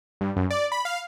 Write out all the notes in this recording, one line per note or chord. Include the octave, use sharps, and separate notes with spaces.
G2
F#2
D5
B5
F5